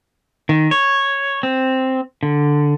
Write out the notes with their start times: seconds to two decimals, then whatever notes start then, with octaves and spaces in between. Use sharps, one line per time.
0.49 D#3
0.71 C#5
1.43 C4
2.23 D3